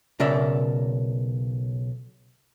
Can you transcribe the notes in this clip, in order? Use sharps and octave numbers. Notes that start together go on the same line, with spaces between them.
B1 C#3 A#4 D5 E5